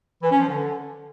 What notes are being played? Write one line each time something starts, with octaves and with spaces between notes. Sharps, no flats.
E3
C#4
F3
D3